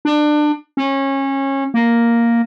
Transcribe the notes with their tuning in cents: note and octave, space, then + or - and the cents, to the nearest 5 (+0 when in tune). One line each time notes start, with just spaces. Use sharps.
D4 +25
C#4 -25
A#3 +0